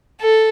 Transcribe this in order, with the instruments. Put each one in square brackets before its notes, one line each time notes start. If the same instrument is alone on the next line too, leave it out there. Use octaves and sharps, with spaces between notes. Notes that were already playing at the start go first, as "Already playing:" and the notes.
[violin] A4